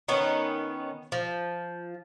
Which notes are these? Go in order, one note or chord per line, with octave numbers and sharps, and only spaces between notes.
D#3 B3 C#4
F3